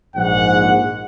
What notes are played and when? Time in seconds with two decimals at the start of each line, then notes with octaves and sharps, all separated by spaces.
0.16 A#1 G#2 F#5